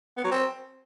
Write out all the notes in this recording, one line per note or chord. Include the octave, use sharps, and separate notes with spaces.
B3
F#3
C4